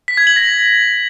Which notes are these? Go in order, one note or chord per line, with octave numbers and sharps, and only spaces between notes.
B6
G#6
F#7
A#6